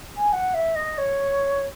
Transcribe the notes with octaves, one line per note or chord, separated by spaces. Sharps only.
G#5
F#5
E5
D#5
C#5